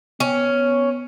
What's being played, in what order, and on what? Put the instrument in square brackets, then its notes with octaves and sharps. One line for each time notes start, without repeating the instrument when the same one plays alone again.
[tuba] B3 [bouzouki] C#4